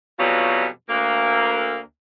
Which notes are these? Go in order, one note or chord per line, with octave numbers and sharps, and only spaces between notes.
F2 B2 E3 F#3 G3 F4
D2 A#3